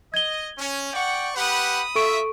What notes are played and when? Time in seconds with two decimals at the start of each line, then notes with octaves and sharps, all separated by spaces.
0.14 D#5 G#6 G7
0.58 C#4
0.93 D5 F#5 G5 C#6
1.35 G4 B4 F#5 B5 D#6
1.95 F4 A4 E5 C#6 D7